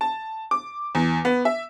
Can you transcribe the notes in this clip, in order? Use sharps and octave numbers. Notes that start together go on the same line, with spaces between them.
A5
D6
E2
B3
E5